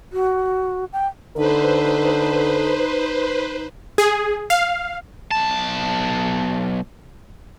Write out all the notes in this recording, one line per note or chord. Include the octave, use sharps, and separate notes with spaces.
F#4
G5
D3 D#4 A4 B4 C5
G#4
F5
B1 A5